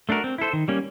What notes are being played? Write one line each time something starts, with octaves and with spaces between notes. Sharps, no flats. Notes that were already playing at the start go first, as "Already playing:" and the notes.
A3 D4 F#4 A#4
C4
E4 A4 C5
D#3
G3 A#3 C#4